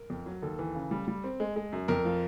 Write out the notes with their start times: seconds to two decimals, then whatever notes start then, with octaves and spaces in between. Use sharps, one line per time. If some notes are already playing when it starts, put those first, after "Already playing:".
Already playing: A#4
0.10 F2
0.26 F#3
0.42 D#2 A4
0.59 E3
0.75 C#3
0.91 G3
1.08 G3
1.24 C4
1.40 G#3
1.56 G#3
1.73 F#2
1.88 F2 A#4
2.05 F3